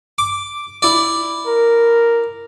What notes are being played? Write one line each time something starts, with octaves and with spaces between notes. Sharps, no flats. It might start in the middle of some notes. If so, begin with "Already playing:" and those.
D6
E4 D5
A#4